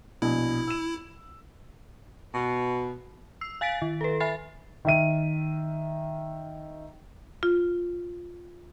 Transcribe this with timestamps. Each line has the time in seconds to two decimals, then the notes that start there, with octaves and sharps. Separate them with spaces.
0.22 A#1 B2 E4
0.68 E6 E7
2.34 B2
3.41 E6 C7
3.61 F5 G#5 A6 B6 D7
3.82 D#3
4.01 A4 B4
4.20 E5 G#5 B5 A6 C7
4.85 D#3 E5 D#7
7.43 F4